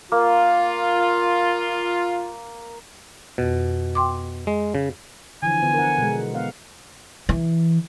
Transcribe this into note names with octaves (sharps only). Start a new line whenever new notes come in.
A#3 F4
F2 B2
G5 C6 D6
G#3
C#3
D3 E3 F3 G#5
D3 B3 C5
A#4 F#5
B2 G#3
B3 F5 F#5
E3